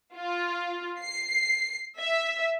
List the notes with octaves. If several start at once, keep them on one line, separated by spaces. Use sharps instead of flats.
F4
C7
E5